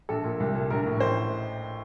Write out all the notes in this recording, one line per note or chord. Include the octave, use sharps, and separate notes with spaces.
A#1 A4
A#2
C2
A#2
A#1 A#4
A2
A1 C5